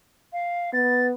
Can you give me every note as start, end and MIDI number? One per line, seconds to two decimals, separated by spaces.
0.33 0.70 77
0.73 1.13 59
0.73 1.06 93